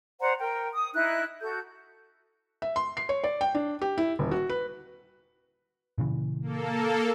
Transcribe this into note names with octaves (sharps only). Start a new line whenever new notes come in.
C5 D5 F#5 A#5
A#4 G5
D#6
D#4 E4 F#6
F#4 A4 G6
E5
C6
C7
C#5
D5
G5
D4
G4
E4
D#1
F#4
B4
A#2 C#3 E3
A#3 A4